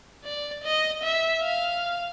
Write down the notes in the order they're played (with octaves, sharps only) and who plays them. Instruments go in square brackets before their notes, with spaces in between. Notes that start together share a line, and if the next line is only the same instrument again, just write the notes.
[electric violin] D5
D#5
E5
F5